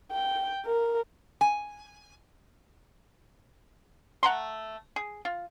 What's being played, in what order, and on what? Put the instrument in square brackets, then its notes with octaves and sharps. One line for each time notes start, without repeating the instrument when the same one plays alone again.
[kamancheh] G5
A#4
[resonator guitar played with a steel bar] G#5
[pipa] A3 F#5 A#5 C6
G#4
F4